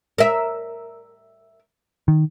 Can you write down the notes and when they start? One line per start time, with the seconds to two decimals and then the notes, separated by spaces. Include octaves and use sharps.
0.18 A#4 E5
2.08 D#3